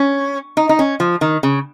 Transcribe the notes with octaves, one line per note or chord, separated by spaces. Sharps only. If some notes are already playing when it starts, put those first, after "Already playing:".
Already playing: C#4
D#4
D#4
C#4
F3
D#3
C#3